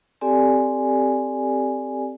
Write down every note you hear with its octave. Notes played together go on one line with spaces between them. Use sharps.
C4 G4 A4 D5 G#5